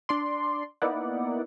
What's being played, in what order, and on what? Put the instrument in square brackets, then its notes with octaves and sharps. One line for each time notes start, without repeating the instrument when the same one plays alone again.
[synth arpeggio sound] D4 D5 C6
A#3 B3 D#4 E4 D5 F#5